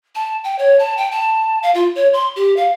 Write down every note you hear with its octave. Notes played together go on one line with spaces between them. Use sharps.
A5
G5
C#5
A5
G5
A5
F5
F4
C#5
C6
G4
F5